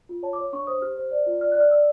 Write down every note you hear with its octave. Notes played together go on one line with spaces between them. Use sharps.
F4
C#5 A5
D6
C#5
D4 C#6
C5 D#6
G4 F6
C5
D5
F4
D5 F6
D5 F#6
F6
D5 E6